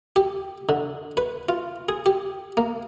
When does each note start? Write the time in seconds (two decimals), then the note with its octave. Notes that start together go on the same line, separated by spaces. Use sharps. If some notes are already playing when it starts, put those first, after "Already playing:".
0.16 G4
0.69 D3
1.17 B4
1.49 F4
1.89 G#4
2.06 G4
2.57 A#3